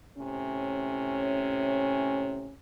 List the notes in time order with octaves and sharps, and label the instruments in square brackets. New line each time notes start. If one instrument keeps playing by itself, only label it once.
[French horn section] A2 C3 C#4